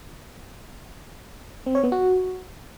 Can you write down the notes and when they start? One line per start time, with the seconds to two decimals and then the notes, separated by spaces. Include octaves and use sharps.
1.66 C4
1.75 C#5
1.83 B3
1.92 F#4